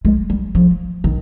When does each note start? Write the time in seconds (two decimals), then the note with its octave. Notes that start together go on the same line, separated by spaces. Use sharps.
0.05 G#3
0.30 G3
0.55 F3
1.04 D#3